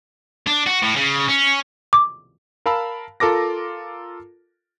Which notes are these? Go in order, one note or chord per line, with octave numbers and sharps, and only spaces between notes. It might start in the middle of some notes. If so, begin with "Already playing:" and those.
D4
F#4
A2
C#3
C#4
D6
A#4 F5 A5 B5 E6
F4 A4 A#4 D6 A#6